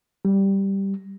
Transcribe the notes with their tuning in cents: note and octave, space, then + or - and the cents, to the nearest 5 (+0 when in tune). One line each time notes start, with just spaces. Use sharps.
G3 +0